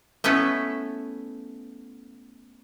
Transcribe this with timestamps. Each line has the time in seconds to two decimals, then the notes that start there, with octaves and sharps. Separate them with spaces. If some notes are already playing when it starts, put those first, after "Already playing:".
0.24 A3 B3 C#4 E4 A4